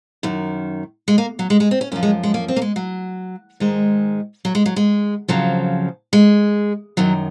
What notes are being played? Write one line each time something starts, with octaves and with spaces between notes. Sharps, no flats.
F#2 D#3
G#3
A#3
F#3
G#3
G#3
C4
C#4
F#2 F3 C#4
G#3
G#3
A#3
C4
A#3
G#3
F#3
G#2 D#3 G#3
F#3
G#3
F#3
G#3
F2 C#3 F3 F#3
G#3
F#2 D#3 F#3